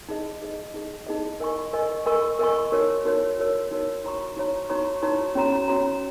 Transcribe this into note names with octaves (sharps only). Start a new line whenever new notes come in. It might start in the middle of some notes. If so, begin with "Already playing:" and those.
D#4 G#4 D#5
D#4 G#4 D#5
D#4 G#4 D#5
D#4 G#4 D#5
A#4 D#5 G#5 C#6
A#4 D#5 G#5 C#6
A#4 D#5 G#5 C#6
A#4 D#5 G#5 C#6
D#4 F#4 A#4 C#5
D#4 F#4 A#4 C#5
D#4 F#4 A#4 C#5
D#4 F#4 A#4 C#5
D#4 F#4 C#5 A#5 C#6
D#4 F#4 C#5 A#5 C#6
D#4 F#4 C#5 A#5 C#6
D#4 F#4 C#5 A#5 C#6
C#4 F#4 C#5 A#5
C#4 F#4 C#5 A#5